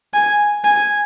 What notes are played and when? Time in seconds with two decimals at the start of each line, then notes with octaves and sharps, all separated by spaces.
0.14 G#5
0.64 G#5